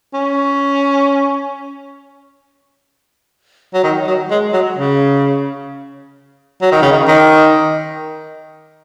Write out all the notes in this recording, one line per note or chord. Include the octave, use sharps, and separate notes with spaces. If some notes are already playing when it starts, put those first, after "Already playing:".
C#4
F#3
D#3
F#3
G#3
F#3
C#3
F#3
D#3
C#3
D#3
D#3